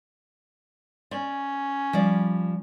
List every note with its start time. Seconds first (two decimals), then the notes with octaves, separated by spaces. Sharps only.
1.11 C#4 D5
1.93 F3 G3 D5